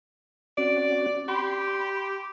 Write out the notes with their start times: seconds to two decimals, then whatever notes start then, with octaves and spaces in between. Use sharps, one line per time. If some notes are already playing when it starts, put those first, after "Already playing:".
0.58 C4 C#4 F#4 D5
1.28 G4 B5 C6